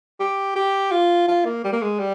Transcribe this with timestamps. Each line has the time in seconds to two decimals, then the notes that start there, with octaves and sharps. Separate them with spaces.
0.20 G4
0.55 G4
0.91 F4
1.28 F4
1.45 A#3
1.64 G3
1.72 A#3
1.82 G#3
1.99 G3